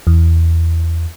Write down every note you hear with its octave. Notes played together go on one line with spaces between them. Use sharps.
E2